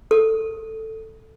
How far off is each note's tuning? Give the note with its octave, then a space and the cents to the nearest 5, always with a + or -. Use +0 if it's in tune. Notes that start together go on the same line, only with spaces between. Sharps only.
A4 +5